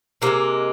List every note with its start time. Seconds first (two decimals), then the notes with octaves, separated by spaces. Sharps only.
0.22 C3 F3 A#3
0.27 G#3